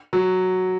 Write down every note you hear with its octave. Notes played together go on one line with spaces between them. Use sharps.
F#3